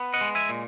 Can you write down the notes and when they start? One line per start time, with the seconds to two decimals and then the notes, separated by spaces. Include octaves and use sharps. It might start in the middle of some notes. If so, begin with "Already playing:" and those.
Already playing: B3
0.14 D#5 F#5
0.21 G#3
0.35 E5 G#5
0.49 A#2